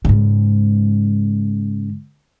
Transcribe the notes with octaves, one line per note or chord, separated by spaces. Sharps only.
G#2 C#3